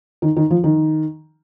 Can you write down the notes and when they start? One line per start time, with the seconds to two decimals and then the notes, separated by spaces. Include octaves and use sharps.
0.22 D#3
0.36 D#3
0.50 F3
0.64 D#3